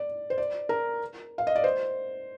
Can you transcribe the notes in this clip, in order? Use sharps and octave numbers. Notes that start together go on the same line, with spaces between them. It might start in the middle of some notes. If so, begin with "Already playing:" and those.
Already playing: D5
C5
D5
A#4
F5
D#5
D5
C5